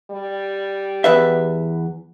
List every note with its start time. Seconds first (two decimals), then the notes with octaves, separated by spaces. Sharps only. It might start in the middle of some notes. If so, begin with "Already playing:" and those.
0.11 G3
1.04 E2 B4 E5